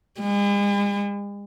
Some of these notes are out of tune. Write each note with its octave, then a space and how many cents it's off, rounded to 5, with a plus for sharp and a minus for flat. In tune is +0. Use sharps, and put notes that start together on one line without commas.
G#3 -45